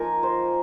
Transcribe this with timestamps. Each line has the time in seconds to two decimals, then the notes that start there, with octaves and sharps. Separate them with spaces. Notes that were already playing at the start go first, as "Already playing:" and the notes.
Already playing: F3 A#3 D#4 A#4 G#5 A#5
0.23 C5